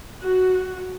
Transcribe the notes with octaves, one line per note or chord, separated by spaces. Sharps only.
F#4